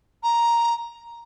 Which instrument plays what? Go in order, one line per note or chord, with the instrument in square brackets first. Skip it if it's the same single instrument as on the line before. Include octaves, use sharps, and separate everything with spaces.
[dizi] A#5